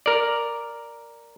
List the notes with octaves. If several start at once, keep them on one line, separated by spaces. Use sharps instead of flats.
A#4 D5